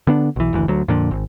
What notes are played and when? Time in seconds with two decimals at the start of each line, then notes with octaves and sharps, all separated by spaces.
0.07 D3 B3 D4
0.36 B1 E3
0.53 F#1 D2 E3
0.68 D2 F#3
0.88 F2 A#2 D3
1.11 G#1